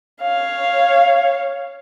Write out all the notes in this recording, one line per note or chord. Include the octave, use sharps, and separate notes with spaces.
C#5 F5